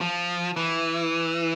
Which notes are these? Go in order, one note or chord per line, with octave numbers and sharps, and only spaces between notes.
F3
E3